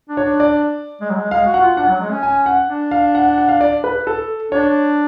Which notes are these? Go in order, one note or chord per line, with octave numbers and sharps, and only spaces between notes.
D4
C#5
D4
D5
G#3
F#3
G#3
G#3 F5
F#4
F#5
F4
D4 F#5
F#3
G#3
C#4
G#5
F#5
D4
F5
F#5
F#5
F#5
F5
D5
B4
A4
D4 C#5